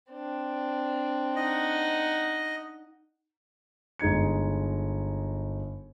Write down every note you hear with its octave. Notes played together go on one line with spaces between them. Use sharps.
C4 D4
D#4 D#5 F#5
G1 G#3 D#4 G#6 C#7